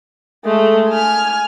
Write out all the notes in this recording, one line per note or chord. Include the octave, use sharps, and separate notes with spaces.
G#3 A3
G#5 F6